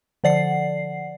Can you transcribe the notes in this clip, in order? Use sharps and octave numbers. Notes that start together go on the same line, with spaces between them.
D3 F3 D5 F#5 C7